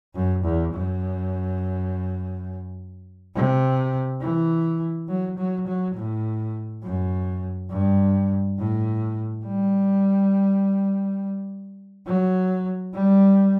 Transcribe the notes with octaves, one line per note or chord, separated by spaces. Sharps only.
F#2
E2
F#2
C3
E3
F#3
F#3
F#3
A2
F#2
G2
A2
G3
F#3
G3